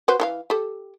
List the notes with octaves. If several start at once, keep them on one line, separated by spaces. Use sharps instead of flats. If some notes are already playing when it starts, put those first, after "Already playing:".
F#4 B4 C5
E3 A4 F5
G4 A4